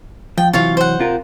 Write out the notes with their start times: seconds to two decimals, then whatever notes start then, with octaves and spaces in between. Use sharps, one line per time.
0.38 F3 G5
0.53 C3 E3 F#3 F4 C#5 F5
0.77 C5 F#5
1.00 C3 F4 A#4